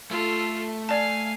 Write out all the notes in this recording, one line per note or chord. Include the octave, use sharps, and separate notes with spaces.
A3 F4 A4
D5 F5 G#5 A5